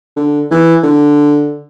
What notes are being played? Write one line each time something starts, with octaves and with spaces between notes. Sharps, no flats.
D3
E3
D3